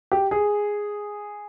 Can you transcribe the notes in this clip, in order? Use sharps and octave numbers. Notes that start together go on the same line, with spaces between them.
G4
G#4